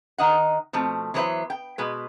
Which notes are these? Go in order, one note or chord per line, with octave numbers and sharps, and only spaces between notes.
D#3 D#5 F#5
B2 F3 A3 C4
E3 F#3 B3 B4 C5 E5
G5
B2 G#3 B4